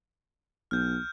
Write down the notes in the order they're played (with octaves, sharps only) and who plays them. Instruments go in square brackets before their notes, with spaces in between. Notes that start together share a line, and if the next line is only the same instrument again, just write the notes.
[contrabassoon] B1 [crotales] F6 G6